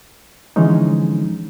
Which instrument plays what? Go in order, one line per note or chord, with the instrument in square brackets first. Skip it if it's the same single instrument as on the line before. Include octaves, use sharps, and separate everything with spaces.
[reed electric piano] D3 E3 F3 G#3 C#4 D#4